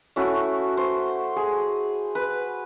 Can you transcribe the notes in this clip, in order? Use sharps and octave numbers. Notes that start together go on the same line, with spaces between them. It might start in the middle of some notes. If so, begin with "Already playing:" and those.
A3 C#4 E4 F#4
C5
G#4
B4